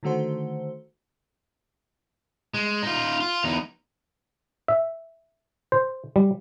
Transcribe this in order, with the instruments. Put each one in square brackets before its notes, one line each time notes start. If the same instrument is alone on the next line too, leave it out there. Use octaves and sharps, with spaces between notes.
[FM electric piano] D3 D#3 A3 F#4 C5
[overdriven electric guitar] G#3
D#4 F4
F4
E2 D#4
[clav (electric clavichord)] E5
C5
G3